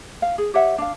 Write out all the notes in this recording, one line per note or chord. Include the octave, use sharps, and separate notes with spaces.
F5
G#4
G4 C#5 E5 F#5
D4 F5